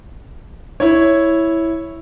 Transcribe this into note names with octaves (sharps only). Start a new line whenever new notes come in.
E4 C#5